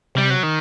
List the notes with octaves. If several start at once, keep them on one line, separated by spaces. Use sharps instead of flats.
C3 G3
F#3
D#3